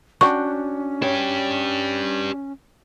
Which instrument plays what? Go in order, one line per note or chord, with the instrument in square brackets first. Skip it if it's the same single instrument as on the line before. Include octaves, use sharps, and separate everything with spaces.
[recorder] C#4 [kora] D4 F#4 G5 [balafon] C#6
[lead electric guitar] D4 G4 [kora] C#5